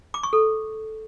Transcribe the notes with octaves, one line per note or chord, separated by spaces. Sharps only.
D6
C#6
A4